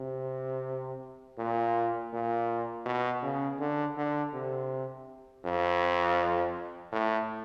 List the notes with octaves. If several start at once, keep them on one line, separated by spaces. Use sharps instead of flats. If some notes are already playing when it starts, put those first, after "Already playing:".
Already playing: C3
A#2
A#2
B2
C#3
D3
D3
C3
F2
A2